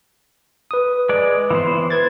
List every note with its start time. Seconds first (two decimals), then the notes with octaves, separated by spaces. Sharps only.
0.71 B4 D#6
1.09 G#3 D5
1.51 E3 B3 C5
1.90 B4 G#6 A6